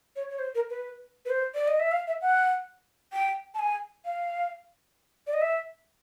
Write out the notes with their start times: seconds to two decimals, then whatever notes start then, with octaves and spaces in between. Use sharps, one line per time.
0.16 C#5
0.30 C#5
0.39 C5
0.55 A#4
0.70 B4
1.25 B4
1.30 C5
1.54 D5
1.68 D#5
1.80 E5
1.92 F5
2.07 E5
2.22 F#5
3.13 G5
3.55 A5
3.59 G#5
4.05 F5
5.27 D5
5.34 D#5
5.41 E5